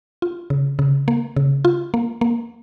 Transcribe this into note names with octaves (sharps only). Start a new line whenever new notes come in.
F4
C#3
C#3
A#3
C#3
F4
A#3
A#3